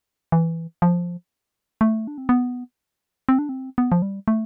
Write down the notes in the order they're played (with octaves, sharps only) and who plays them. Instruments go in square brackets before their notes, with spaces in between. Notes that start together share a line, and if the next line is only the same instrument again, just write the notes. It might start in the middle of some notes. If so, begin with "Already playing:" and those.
[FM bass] E3
F3
A3
D4
C4
B3
C4
D4
C4
B3
F3
G3
A3